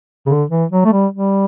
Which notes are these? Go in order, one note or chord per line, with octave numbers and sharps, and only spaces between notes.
C#3
D3
E3
F#3
A3
G3
G3